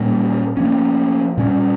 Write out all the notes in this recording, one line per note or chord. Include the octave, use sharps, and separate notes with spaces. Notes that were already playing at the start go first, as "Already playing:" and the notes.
Already playing: A#2 G3 A#3 C#4
F3 A#3 C#4
A#2 G3 C#4